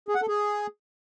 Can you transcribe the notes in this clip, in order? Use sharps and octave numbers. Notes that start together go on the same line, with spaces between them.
G#4
F#5
A4
G#4